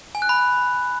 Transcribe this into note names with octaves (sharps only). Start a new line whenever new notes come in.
G#5
F#6
B5